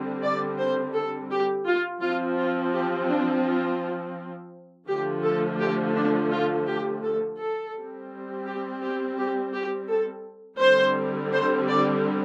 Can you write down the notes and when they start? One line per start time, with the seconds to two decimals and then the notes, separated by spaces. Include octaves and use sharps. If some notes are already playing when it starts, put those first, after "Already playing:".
Already playing: D3 G3 C4
0.23 D5
0.59 C5
0.94 A4
1.31 G4
1.67 F4
2.02 F3 C4 F4
2.38 F4
2.74 G4
3.09 D4
3.45 F4
4.88 D3 F3 A3 G4
5.24 A4
5.60 G4
5.96 D4
6.31 F4
6.67 G4
7.03 A4
7.39 A4
7.75 G3 C4
8.46 G4
8.83 G4
9.17 G4
9.54 G4
9.89 A4
10.61 D3 G3 C4 C5
11.32 C5
11.68 D5